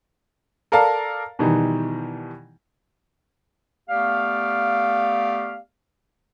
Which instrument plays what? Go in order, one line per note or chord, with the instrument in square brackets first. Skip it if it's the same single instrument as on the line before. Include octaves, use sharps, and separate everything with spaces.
[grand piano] A4 A#4 D5 F5 A5
B2 D#3 E3 G3 D#4
[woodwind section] A3 B3 G4 D5 F5